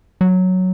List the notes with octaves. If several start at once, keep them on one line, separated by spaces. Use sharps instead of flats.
F#3